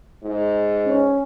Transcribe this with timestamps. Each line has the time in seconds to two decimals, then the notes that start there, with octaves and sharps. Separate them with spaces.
0.23 G#2
0.85 C#4